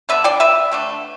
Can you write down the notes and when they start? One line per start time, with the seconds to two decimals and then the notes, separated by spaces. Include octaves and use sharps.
0.09 D3 B3 D4 B4 E5
0.24 D5 G5
0.40 B4 E5
0.72 D3 A3 D4